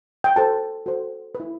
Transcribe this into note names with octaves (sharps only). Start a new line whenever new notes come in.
G5
F#4 A4 C5 A5
F#4 A4 C5
B4
E4